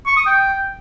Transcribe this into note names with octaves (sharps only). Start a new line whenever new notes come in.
C#6
D#6
G5